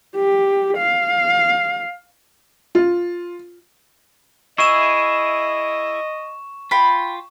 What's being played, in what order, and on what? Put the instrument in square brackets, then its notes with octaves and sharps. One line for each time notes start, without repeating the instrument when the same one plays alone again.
[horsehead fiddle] G4
F5
[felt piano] F4
[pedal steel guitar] E4 G#4 E5 [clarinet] D#5 [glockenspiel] C#6 E7
[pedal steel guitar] F4 [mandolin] G5 B5